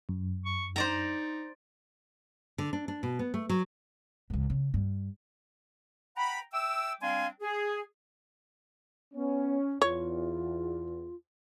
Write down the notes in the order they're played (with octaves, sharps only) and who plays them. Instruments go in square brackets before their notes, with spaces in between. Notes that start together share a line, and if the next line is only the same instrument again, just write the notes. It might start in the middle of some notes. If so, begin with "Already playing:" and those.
[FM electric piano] F#2
[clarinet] C#6
[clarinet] D#4 [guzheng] C5 D5 A#5
[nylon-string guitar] D3
D4
D4
B2
B3
A3
F#3
[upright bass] C#2 G#2
C#3
G2
[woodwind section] F#5 G5 A#5 B5
E5 G5 D6 E6
G3 C4 D4 F5 G#5 C6
G#4
[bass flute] B3 [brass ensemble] C#4
[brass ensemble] E2 [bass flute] F4 [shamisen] C#5